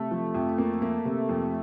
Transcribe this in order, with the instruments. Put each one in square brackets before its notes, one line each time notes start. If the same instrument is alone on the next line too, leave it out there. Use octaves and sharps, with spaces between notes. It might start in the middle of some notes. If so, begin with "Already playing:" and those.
Already playing: [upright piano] C3 [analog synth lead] A3
[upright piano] F3
F2
A#3
A#3
C3
F2